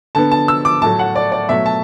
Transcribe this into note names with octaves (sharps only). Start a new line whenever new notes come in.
D3 B3 A5
A5
E6
D6
A2 F#3 A3 A5
F#5
D5
D5
B2 F#3 A3 E5
A5